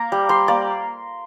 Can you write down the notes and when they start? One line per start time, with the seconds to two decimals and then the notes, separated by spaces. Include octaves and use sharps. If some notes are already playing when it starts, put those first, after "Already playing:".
Already playing: A#3 A#5
0.12 G3
0.29 G3 C6
0.48 A#3 D5